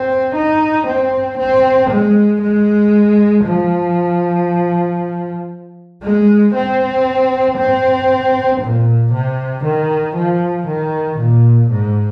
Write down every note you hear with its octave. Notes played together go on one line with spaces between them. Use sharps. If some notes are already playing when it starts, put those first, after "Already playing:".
Already playing: C4
D#4
C4
C4
G#3
G#3
F3
G#3
C4
C4
A#2
C3
D#3
F3
D#3
A#2
G#2